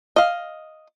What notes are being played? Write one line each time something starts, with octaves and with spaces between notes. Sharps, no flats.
D#5 F5